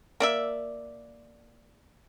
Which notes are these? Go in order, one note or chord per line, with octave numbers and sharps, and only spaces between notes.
A#3 D5 E5